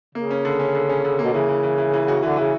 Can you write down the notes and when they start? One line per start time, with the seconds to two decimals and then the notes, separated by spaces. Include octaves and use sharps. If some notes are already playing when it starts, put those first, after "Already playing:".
0.15 C#3 A#3
0.31 C#4
0.45 D3
0.60 C#4
0.75 D3
0.89 C#4
1.05 D3
1.19 A#3
1.24 B2
1.34 C#3 E3
1.49 E3
1.63 E3
1.78 E3
1.93 E3
2.08 F#4
2.23 D3 E3
2.37 C#3 E3